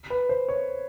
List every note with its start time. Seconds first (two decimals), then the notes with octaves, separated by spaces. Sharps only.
0.10 B4
0.29 C5
0.49 C#5